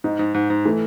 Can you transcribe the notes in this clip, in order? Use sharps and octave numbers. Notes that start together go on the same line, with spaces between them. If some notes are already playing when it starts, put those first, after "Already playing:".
G#2 D#4
G#2
G#2
G#2
E3 A3